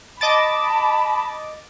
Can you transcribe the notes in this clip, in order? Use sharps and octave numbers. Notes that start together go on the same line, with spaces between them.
D#5 A5 B5 D6 A6